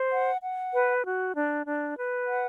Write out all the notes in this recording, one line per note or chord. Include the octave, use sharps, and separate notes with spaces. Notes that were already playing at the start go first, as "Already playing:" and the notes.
Already playing: C5
F#5
F#5
B4
F#4
D4
D4
B4
F#5